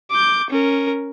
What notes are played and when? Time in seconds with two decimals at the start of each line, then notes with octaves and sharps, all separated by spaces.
0.11 D6 G6
0.51 C#4 A#4